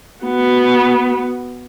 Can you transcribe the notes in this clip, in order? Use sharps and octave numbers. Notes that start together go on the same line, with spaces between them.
B3 F#4